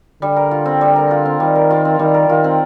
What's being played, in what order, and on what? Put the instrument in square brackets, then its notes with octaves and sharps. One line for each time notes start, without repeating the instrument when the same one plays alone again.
[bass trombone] D3 [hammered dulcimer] G3
[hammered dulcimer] A#4
F4
C4
G3
A#4
F4
C4
[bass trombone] D#3 [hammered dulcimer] G3
[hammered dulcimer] A#4
F4
C4
[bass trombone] D#3 [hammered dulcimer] G3
[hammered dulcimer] A#4
[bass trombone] D#3 [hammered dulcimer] F4
[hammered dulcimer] C4